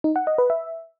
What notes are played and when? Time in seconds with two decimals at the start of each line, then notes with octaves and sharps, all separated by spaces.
0.04 D#4
0.16 F#5
0.27 D#5
0.38 B4
0.50 E5